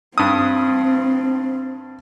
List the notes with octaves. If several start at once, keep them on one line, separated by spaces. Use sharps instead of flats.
G2 C4 D#6